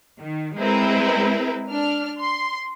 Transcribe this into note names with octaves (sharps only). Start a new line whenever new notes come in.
D#3
G#3 C4 E4 A#4 B4
D4 F6
C6